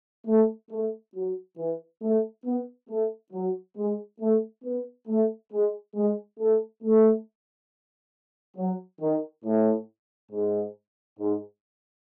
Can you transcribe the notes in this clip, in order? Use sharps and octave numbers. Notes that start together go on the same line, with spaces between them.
A3
A3
F#3
E3
A3
B3
A3
F#3
G#3
A3
B3
A3
G#3
G#3
A3
A3
F#3
D#3
A2
G#2
G#2